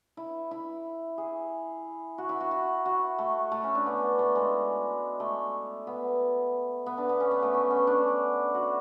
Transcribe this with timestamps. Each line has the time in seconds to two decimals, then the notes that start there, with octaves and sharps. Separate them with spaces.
0.17 E4
0.51 E4
1.18 G#4
2.18 F#4
2.29 E4
2.40 F#4
2.51 F#4
2.86 F#4
3.18 A3
3.52 A3
3.64 C#4
3.75 D4
3.86 B3
4.19 A3
4.35 G#3
5.20 A3
5.87 B3
6.86 B3
6.98 D4
7.09 B3
7.20 C#4
7.31 B3
7.43 A3
7.54 B3
7.71 C#4
7.87 D4
8.54 F#4